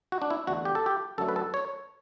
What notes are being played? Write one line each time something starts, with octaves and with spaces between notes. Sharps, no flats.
F#4
D4
E4
E2 D3 A3 F#4
G4
A4
G4
F#2 D3 F#3 A3 A4
B4
A4
C#5